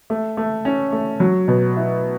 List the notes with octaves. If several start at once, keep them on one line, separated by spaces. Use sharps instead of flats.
A3
A3
C#4
A3
F#3
B2
E4